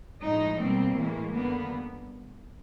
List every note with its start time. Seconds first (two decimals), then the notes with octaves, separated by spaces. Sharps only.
0.23 A2 F3 G#3 D#4
0.59 B2 G3 A#3 C4
0.95 A2 E3 G#3 A#3
1.32 F2 D3 G3 A#3 B3